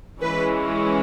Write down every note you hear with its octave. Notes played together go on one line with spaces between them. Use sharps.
E3 G#3 C#4 B4